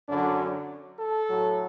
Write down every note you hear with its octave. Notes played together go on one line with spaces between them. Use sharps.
F#2 D3 F#3 D4
A4
A2 F#3